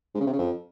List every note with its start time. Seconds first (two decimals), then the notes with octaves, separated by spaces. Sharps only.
0.15 G#2
0.21 C#3
0.27 C3
0.33 C#3
0.39 F2